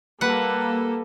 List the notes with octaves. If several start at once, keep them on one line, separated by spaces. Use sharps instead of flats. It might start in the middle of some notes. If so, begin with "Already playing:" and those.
G3 A#3 A4 B4 F#5